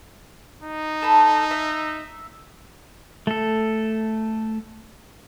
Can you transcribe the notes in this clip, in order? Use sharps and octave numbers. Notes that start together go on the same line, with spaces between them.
D#4
A4 B5
E5
A3 A4